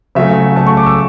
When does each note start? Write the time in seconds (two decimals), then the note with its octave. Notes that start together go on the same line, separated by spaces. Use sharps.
0.15 C#3 F#3 A3 E5
0.56 C#3 F#3 A3 A5
0.67 C#6
0.77 D6
0.86 E6